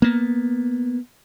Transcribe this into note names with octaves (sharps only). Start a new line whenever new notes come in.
A#3 B3